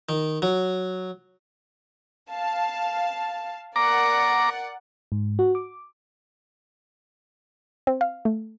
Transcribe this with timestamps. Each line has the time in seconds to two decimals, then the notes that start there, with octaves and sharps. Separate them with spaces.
0.09 D#3
0.42 F#3
2.30 F5 A5
3.76 A#4 D5 F#5 A#5 D6
5.12 G#2
5.39 F#4
5.55 D6
7.87 C4
8.01 F5
8.25 A3